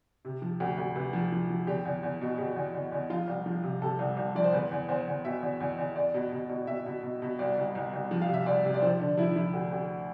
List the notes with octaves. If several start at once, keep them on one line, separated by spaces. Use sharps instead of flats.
C3
F3
D2
D2
C3 B4
F3
F3
F3
E2 G4
E2
E2
B2
B2 G4
E2
E2
E2
F3 F4
C2
F3
C3
C3 A4
C2
C2
F3 D5
C5
E2 B4
E2
E2 C5
E2
B2 E5
E2
E2
E2
E2 D5
B2
B2
B2
B2 E5
B2
B2
B2
C2 D5
C2
C2
C2
F3
F5
C3
E5
C2 D5
C3
D5
F3 C5
D3 D4
F3 E4
F3 E4
D2
D2